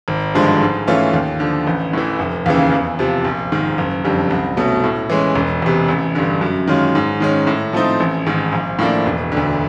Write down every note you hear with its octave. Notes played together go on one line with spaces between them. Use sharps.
G#1
G2 D3 F3 G#3
G#2
E3 A3 C#4 F4
D#2
D3 F3
A1
A2 E3
F1
D#2 C#3 E3
E2
C3 F3
A#1
G#2 D#3
F#1
F2 D3 G3
C2
B2 F#3 A3 C#4
A2
E3 G#3 C#4
E1
E2 C3
A1
G2 D3
F#2
D#3 G#3 C#4 F4
G#2
D#3 G#3 C#4
A2
F3 A3 C4 D#4
A1
G#2 D#3
A#1
A2 F3 A#3 D4
E1
D2 D3